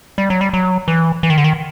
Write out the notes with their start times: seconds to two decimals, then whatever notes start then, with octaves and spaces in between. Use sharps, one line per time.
0.18 G3
0.30 F#3
0.41 G3
0.53 F#3
0.88 E3
1.23 E3
1.30 D#3
1.38 D3
1.44 D#3